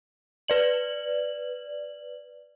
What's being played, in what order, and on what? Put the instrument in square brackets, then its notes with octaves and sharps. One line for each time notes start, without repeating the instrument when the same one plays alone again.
[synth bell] B4 D5 F#7